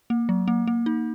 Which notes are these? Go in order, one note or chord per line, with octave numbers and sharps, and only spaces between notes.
A#3
F#3
A#3
A#3
D#4